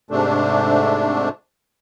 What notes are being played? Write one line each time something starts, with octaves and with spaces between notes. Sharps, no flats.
G#2 C3 A3 D4